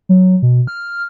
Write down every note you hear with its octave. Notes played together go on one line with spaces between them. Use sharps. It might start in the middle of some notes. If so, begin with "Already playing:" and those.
F#3
B2
F6